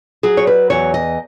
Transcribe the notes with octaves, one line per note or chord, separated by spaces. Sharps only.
F#3 G#4
C#5
B4
E2 C#5
D#5